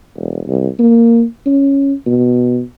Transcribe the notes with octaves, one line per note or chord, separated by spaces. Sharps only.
E1
C2
A#3
C#4
B2